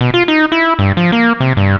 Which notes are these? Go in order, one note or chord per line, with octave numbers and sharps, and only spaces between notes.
B2
F4
D#4
E4
G2
F3
A#3
C3
G2